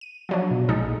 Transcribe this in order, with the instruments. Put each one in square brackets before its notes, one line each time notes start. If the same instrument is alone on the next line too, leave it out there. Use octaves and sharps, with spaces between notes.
[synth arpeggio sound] D#7
F3 F#3 D4
[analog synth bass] B2
[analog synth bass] A#1 [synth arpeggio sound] G#3 D#4 A4